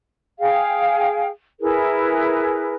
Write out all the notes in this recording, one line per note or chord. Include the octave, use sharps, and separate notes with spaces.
G#4 F5 G5
E4 G#4 A#4 B4